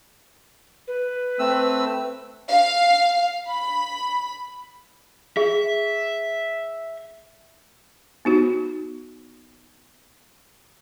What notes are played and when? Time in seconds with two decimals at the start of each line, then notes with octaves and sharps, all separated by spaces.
0.88 B4
1.39 A3 C4 E6
2.50 F5
3.47 B5
5.37 G#4 E5
8.25 B3 D#4 F#4